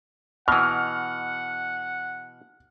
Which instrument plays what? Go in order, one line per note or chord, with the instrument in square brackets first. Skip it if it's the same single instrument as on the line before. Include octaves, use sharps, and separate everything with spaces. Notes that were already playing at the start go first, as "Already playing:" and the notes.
[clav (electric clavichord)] B2 E3 [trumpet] F#5 [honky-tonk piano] F6